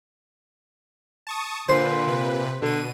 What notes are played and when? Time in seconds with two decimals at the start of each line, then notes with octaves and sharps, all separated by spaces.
1.27 A5 C#6 D#6
1.69 A#2 D3 B4 C5
2.07 C3 B4
2.62 B2 D3 D#7